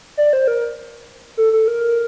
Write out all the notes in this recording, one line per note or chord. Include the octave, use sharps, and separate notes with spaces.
D5
C5
A#4
A4
A4
A#4